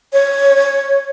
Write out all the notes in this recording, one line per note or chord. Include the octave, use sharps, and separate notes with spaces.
C#5